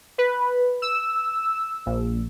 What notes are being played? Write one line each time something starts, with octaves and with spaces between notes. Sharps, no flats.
B4
E6
A#1